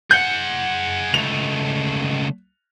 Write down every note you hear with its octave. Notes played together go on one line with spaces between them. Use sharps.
G#4 F#5 G6
C#2 A3 F7